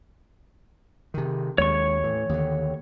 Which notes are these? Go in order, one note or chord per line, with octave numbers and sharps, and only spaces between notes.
C3 D#3
D#2 G#3 C#5 C#6
A2 E3
D#2 D3